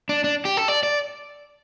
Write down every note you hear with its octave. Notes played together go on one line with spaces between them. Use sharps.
D4
D4
G4
A4
D5
D5